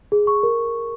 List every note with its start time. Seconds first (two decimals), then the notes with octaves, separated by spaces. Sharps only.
0.12 G#4
0.27 C#6
0.43 A#4